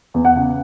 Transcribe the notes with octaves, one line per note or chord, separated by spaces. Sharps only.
E2
F#5
C#3